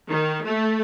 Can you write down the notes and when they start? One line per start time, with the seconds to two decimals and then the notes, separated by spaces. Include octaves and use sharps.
0.11 D#3
0.45 A3